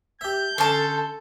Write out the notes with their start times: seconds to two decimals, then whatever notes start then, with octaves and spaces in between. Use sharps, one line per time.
0.21 G4 E5 G6
0.58 D3 C#4 D4 A4 A5 C6